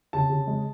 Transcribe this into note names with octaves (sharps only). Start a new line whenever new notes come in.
C#3 A5
C#3
G#3